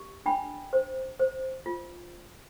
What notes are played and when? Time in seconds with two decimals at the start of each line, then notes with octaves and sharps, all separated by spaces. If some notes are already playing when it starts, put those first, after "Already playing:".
Already playing: G4
0.26 D4 G5 B5
0.73 C5
1.19 C5
1.66 F4